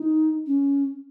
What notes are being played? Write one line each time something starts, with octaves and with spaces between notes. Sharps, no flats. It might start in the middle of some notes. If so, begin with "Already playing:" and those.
Already playing: D#4
C#4